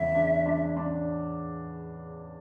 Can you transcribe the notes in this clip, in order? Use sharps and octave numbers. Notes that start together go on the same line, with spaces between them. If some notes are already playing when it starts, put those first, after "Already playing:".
Already playing: E2 C#3 E5
D4
D4
D4